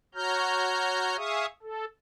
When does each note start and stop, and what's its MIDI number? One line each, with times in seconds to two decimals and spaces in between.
0.15 1.16 66
0.15 1.16 73
0.15 1.16 82
0.15 1.16 89
0.15 1.16 91
1.17 1.46 68
1.17 1.46 76
1.17 1.46 77
1.17 1.46 85
1.17 1.46 87
1.62 1.85 69